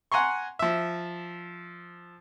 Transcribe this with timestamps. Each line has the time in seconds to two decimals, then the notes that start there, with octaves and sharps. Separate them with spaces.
0.12 F#5 G#5 A#5 C6 C#6
0.59 F3 E5